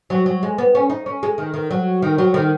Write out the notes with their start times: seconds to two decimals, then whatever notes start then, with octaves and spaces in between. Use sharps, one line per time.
0.10 F#3
0.26 F#3
0.43 G#3
0.58 B3
0.75 C#4
0.90 D#4
1.06 C#4
1.23 G#3
1.38 D#3
1.54 D#3
1.71 F#3
2.02 D#3
2.18 F#3
2.34 D#3